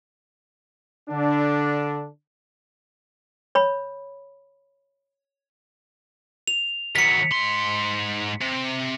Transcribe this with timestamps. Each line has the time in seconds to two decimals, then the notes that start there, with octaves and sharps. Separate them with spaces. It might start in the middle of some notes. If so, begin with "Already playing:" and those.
1.10 D3 D4
3.55 C#5 B5
6.48 F7
6.95 D#3 F#3 B6 C#7
7.31 G#2 C6
8.41 C3